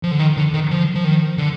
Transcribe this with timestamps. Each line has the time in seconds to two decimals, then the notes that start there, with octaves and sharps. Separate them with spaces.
0.03 F3
0.12 D3
0.19 D#3
0.37 D3
0.54 D#3
0.71 F3
0.95 F3
1.04 D#3
1.38 D3